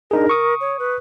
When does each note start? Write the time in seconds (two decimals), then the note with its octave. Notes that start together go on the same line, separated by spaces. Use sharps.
0.11 D4 D#4 G#4 A#4
0.29 C#6 D#6
0.61 C#5
0.79 B4